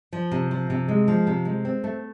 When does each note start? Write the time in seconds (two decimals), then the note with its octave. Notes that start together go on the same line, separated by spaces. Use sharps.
0.13 F3
0.31 C3
0.51 F3
0.70 C3
0.88 G#3
1.08 F3
1.27 C3
1.45 G#3
1.65 C4
1.84 A3